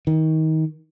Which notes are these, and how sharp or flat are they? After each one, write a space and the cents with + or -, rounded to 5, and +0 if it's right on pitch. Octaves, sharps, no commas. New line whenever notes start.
D#3 +25